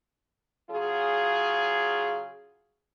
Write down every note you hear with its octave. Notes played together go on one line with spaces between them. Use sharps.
C#3 F#3 F4 G#4